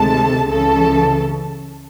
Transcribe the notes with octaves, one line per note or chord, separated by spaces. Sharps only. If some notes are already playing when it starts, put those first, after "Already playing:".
Already playing: D2 C3 D#3 G#3 A4 A5
C#2 C#3 E3 A4 A5